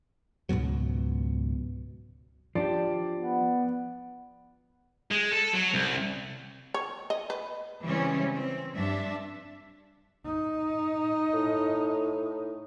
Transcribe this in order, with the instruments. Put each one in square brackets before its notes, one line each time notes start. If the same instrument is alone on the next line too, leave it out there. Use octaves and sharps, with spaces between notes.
[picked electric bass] C#2 G#2 B2 F#3
[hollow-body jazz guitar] F3 D4 G4 [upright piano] D5
[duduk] B3
[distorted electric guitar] G#3
A4
F#3
C2
[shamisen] C#5
D#5
B4
[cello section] C#3 E3 G3 G#3 C4 C#4
C4
G2 D4 E5
[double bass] D#4
[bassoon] A2